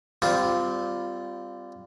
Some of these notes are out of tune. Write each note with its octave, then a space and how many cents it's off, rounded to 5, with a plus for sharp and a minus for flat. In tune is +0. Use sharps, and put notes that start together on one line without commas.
G3 +0 C4 -25 F4 +0